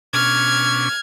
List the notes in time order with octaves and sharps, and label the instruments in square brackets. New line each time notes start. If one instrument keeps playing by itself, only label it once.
[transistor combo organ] B2 C#4 D4 [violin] F6 G#6